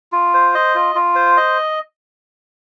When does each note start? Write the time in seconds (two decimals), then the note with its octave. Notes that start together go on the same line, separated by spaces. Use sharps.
0.12 F4
0.34 C5
0.55 D#5
0.75 F4
0.95 F4
1.15 C5
1.37 D#5